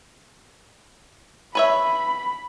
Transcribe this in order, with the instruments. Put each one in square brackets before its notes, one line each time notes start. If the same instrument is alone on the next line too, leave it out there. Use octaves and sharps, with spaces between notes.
[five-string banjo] B4 C#5 E5 [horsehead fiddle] B5